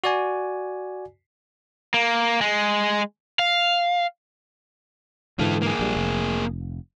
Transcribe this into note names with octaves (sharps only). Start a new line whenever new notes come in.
F#4 D5 G#5
A#3
G#3
F5
G#2 D3 E3 F4 A4
A#3 G#4
A#1 G3
F1